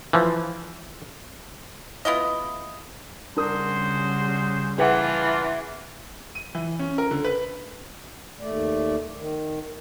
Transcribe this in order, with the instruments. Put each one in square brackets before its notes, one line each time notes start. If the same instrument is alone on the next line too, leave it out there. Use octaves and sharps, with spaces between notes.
[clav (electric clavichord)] E3 F3
[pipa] B3 E4 F4 D#5
[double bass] C#3 G3 [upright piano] D4 A#4 D#6 [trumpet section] F#4 G#4 C5
[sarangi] E3 [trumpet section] D4 F4 [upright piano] G#4 B4 F#5
[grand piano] D#7
E3
C#4
A#4
D3
B4
[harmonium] D#2 A3 D5
D#3